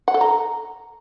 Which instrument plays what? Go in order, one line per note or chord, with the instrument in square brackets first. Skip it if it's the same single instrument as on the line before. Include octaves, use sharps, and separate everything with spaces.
[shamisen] F#5
A4
A#5